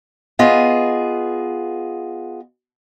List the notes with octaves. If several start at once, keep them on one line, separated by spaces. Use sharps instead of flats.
B3 F4 G#4 D#5